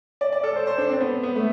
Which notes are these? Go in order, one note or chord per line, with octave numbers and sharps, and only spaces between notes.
D5
D5
A4
C5
C5
D4
C4
B3
B3
A3